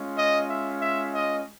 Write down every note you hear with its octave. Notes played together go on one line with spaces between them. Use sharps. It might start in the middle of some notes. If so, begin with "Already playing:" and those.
Already playing: G#3 C#4 F4
D#5
E5
E5
D#5